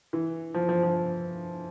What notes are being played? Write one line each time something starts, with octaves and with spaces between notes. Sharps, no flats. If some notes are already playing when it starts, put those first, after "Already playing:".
E3
F3
F3
F3